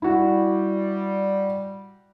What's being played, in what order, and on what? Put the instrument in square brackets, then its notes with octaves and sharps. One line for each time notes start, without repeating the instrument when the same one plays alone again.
[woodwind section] G3 [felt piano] E4 F#4